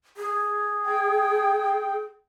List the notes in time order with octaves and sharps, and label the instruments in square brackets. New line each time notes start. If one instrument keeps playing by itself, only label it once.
[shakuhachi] G#4
[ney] G5